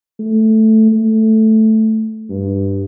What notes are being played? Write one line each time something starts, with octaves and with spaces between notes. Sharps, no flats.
A3
A3
G2